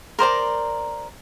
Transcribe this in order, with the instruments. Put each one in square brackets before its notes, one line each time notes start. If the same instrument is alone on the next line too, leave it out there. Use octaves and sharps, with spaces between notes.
[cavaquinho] A#4 C5 D5 A#5